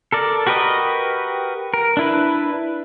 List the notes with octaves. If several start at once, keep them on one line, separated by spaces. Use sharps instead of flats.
A4 A#4 D5
F#4 G4 A#4 B4 D#5
A#4
D4 E4 B4